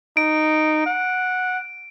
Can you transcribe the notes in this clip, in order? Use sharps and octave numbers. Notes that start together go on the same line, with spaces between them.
D#4 D7
F#5